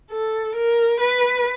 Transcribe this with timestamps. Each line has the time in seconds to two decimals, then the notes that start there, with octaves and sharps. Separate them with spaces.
0.11 A4
0.56 A#4
1.00 B4